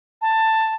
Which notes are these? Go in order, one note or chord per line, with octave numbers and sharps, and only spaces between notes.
A5